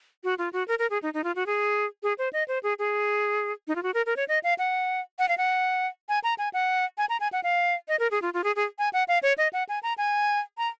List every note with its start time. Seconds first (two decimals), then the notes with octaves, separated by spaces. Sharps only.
0.24 F#4
0.38 F4
0.53 F#4
0.68 A#4
0.79 A#4
0.90 G#4
1.03 D#4
1.14 D#4
1.24 F4
1.36 F#4
1.46 G#4
2.03 G#4
2.18 C5
2.33 D#5
2.48 C5
2.63 G#4
2.79 G#4
3.68 D#4
3.76 F4
3.83 F#4
3.94 A#4
4.06 A#4
4.16 C#5
4.28 D#5
4.43 F5
4.58 F#5
5.19 F#5
5.28 F5
5.38 F#5
6.09 G#5
6.24 A#5
6.38 G#5
6.54 F#5
6.98 G#5
7.09 A#5
7.20 G#5
7.33 F#5
7.43 F5
7.88 D#5
7.99 A#4
8.11 G#4
8.22 F4
8.34 F4
8.44 G#4
8.56 G#4
8.79 G#5
8.93 F#5
9.08 F5
9.23 C#5
9.38 D#5
9.53 F#5
9.69 G#5
9.83 A#5
9.98 G#5
10.58 A#5